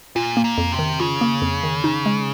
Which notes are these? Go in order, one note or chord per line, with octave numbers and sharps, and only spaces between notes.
A#2 F4
A#3
A#2
F2
C3
D#3
C#3 F4
A#3
F2
D#3
D#4
G#3